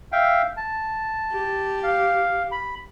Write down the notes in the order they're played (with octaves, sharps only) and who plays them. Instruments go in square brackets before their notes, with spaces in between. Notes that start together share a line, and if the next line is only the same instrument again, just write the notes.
[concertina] E5 F5 G5
A5
[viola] G4
[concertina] F5
B5